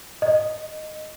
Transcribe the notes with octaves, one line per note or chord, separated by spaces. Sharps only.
D#5